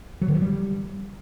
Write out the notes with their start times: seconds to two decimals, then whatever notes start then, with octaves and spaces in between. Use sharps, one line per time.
0.21 F#3
0.28 D3
0.35 E3
0.42 G3